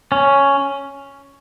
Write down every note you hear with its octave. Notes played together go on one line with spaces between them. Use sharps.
C#4